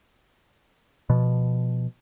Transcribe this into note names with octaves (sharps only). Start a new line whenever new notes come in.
B2 F3